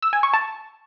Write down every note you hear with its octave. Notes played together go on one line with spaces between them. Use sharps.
E6
G#5
C#6
A5